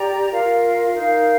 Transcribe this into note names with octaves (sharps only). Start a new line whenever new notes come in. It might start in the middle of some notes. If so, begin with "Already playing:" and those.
Already playing: G4 D5 G5 A#5
F4 A#4 F5
D#4 A#4 F5